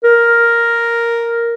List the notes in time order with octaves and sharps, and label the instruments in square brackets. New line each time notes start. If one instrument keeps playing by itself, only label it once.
[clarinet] A#4